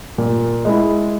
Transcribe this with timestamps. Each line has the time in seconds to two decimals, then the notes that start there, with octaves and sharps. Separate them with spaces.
0.18 A#2
0.65 G#3 E4